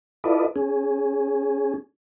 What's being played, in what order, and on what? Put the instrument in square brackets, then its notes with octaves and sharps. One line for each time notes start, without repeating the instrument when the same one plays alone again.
[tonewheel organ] E4 F4 A4 B4 D5 D#5
C#4 G#4